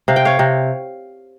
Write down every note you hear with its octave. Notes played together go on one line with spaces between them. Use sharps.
C3 F5
G5
C#5 F5
C3